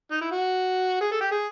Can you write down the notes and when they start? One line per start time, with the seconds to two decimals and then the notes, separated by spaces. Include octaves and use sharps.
0.11 D#4
0.21 E4
0.31 F#4
1.01 G#4
1.12 A4
1.21 G4
1.31 G#4